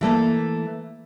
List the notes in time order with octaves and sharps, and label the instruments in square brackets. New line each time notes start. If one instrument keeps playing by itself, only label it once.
[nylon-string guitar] E3 A3 A#3